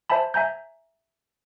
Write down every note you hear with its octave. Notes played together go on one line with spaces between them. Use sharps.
C5 E5 G#5 A5 B5
E5 G#5 A#5 G6